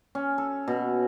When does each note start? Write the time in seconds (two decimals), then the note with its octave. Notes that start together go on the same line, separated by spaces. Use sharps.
0.15 C#4
0.38 A4
0.68 B2